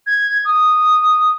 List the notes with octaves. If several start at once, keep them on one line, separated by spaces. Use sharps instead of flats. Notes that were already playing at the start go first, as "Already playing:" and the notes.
G#6
D#6